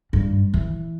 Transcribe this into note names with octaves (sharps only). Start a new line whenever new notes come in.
G2
E3